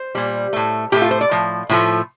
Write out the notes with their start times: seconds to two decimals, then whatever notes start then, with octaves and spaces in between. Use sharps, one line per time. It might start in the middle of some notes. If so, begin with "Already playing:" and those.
Already playing: C5
0.15 A#2 G3
0.53 A2 A3
0.92 A2 A3 G4
1.02 F4
1.11 C5
1.21 D5
1.31 A2 F3
1.69 A2 F3 A3